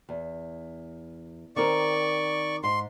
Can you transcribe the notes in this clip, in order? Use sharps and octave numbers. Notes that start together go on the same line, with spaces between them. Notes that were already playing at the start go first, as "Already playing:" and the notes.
E2
D#3 C4 A#4 D5 C#6
G#2 C6